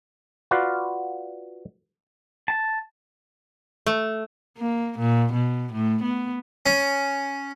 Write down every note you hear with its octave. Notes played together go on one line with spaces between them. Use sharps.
F4 F#4 B4 D5 F5
A5
A3
A#3
A#2
B2
A2
B3
C#4